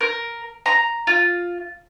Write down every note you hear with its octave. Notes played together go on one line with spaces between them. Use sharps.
A#4
A#5
F4